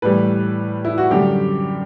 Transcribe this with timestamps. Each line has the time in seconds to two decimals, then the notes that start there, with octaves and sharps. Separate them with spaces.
0.02 A2 E3 G3 B4
0.85 E4
0.98 F#4
1.11 F#2 D3 G3 G4